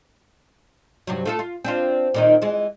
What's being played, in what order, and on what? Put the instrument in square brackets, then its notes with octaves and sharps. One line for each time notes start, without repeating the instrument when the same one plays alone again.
[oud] G2 C3 F#3
A3 F4 A4
F4
C4 D4 F4
A#2 D#3 D#4
E3 G#3